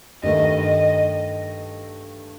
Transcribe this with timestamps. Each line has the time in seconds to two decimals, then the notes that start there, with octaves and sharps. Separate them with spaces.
0.23 G2 D#3 A3 D#5
0.61 D#5